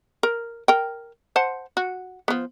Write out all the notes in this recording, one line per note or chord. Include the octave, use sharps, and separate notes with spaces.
A#4
A#4 G5
C5 F#5 A5
F#4
F3 B3